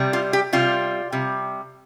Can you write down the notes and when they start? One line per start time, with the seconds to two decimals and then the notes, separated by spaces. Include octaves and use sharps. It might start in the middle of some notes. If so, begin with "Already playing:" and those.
Already playing: C3 G3
0.13 F4
0.33 G4
0.53 C3 G3 F4
1.12 C3 G3